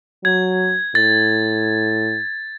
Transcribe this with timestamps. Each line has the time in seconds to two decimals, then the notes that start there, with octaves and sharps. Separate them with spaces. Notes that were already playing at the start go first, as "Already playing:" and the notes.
0.25 F#3 G#6
0.95 A2 A6